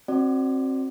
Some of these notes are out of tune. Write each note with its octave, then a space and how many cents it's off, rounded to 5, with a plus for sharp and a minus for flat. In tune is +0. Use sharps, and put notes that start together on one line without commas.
C4 +25 F#4 +0 D5 +10